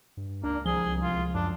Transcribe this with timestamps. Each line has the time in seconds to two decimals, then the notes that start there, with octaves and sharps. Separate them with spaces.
0.17 G2
0.43 C#2 A#3 D4
0.66 C2 F3 G#4 G7
1.02 F4
1.35 F#2 D4